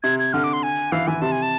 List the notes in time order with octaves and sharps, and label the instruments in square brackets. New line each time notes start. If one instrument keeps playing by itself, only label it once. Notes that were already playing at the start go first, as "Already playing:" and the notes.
[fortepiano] C3 [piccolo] G#6
[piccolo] G#6
[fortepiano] D3 [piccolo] F6
[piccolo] D6
C6
G#5
[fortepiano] E3 [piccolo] F5
[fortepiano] E3 [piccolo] G#5
[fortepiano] C3 [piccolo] A5
[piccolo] G#5
A5